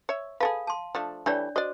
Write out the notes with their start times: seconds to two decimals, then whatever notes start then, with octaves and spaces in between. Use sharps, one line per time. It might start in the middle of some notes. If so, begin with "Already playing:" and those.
0.09 C#5 E5
0.40 G#4 A4 B4 F5
0.67 A5 C6
0.95 F3 A3 D4
1.26 E3 G3 A3 D4 C#5 D5
1.56 F#4 C5 D5 D#5